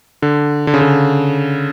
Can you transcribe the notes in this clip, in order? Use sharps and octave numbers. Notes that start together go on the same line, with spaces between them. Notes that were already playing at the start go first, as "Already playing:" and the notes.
D3
D3
C#3
D3